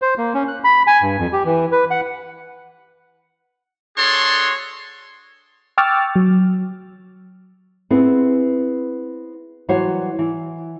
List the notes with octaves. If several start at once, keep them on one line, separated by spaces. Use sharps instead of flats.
C5
A#3
C#4
F#6
B5
G#5
G2
F2
G4
E3
B4
F#5
D4 F#4 G#4 A4 C#5 C6
G5 C#6 D6 E6 F6 A6
F#3
B3 C4 E4 G#4 C5
E3 F#3 G3 F#4 C5 C#5
E3